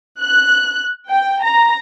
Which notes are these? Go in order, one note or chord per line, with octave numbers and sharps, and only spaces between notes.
F#6
G5
A#5